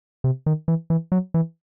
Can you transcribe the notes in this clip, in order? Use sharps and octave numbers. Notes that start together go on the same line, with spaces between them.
C3
D#3
E3
E3
F#3
E3